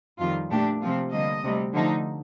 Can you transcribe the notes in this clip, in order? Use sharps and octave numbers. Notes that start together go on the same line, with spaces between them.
F2 D#3 G3 F4
A#2 A3 D4 G4
C3 F3 C4 F4
D3 G3 A#3 D#5
D2 C3 G3
D3 F3 A3 D#4